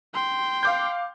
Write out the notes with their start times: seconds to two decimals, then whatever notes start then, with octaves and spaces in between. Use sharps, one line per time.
0.14 G5 C6
0.63 F5 D6 G6